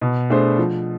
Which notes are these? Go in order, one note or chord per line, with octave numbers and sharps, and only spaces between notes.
B2
A3 D4 G#4 C5
F3